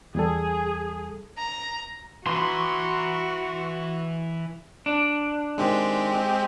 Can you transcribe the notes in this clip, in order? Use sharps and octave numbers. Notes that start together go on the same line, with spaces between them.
E2 G3 G#4 A4
A#5
E3 E4 F#4 B5 C6
D4
D#3 G#3 C4 D#4 G4